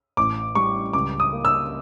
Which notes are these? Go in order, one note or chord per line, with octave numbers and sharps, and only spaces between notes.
A1 D6
G3 C#6
C#2 D6
D#6
A#3
E6